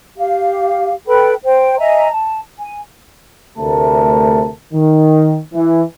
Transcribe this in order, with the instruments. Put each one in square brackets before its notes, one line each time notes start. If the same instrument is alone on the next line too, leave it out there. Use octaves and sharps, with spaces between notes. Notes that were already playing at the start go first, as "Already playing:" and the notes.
[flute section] G4 F5
A4 B4 G5 B5
C5 G5
D#5 E5 G#5 A#5
A5
G#5
[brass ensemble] D2 C3 A3 A#4 A5
D#3
E3